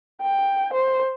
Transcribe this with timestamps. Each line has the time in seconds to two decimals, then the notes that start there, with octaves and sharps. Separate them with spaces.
0.22 G5
0.73 C5